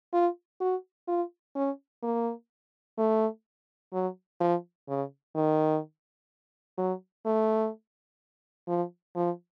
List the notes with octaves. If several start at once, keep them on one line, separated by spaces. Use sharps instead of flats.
F4
F#4
F4
C#4
A#3
A3
F#3
F3
C#3
D#3
F#3
A3
F3
F3